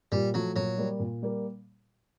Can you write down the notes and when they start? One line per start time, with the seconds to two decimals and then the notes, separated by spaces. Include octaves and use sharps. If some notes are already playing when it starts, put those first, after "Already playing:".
0.12 A#2 G3
0.34 F3 F#3 A3
0.56 A#2 F#3
0.78 G3 A#3
1.00 A#2
1.23 G3 A#3